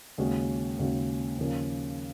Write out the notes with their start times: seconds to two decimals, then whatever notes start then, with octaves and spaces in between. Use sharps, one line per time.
0.18 D#2 C#3 G#3 C#4 F#4
0.79 D#2 C#3 G#3 C#4 F#4
1.38 D#2 C#3 F3 A#3 C#4